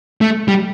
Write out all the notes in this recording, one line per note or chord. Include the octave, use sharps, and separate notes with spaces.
A3
G3